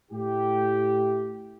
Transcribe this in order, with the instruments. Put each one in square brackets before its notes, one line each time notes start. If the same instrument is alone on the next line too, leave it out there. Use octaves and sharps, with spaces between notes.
[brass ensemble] A2 E4 G4